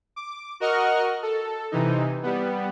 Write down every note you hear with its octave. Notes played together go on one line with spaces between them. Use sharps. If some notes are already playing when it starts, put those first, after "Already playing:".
D6
F#4 A#4 D#5 F#5 C#6 F6
A4
C3 E3 D#4
G3 B3